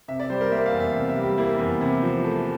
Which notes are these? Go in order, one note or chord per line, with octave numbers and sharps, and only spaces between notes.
C3 E5
D5
G3 C5
A#4
A#3 E5
F5
E2
E5
C3
E5
G3
G4
A#3 E4
E2
C3 E4
F3
A3